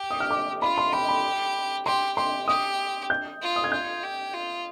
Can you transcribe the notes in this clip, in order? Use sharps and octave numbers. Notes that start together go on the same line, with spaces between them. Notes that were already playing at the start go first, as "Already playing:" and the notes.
Already playing: G4
D#6
F6
D6
F4 B5
C6
G4 B5
B5
G4 C6
G4 C6
G4 D#6
G6
F4
D#6
G#6
F4 G6
G4
F4